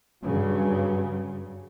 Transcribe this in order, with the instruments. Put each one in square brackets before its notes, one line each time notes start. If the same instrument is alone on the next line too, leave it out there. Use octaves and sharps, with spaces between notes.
[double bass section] G2 C#3 F#3